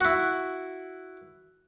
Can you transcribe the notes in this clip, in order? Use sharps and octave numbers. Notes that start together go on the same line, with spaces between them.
E4 F#4